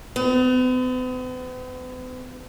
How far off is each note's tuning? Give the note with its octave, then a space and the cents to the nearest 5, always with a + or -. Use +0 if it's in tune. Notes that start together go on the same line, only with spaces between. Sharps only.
B3 +45